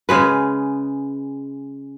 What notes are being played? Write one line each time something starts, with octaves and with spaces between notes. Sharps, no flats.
C#3 G#3 B4